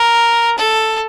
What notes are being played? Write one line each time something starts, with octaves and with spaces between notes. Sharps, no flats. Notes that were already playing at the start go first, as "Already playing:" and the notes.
Already playing: A#4
A4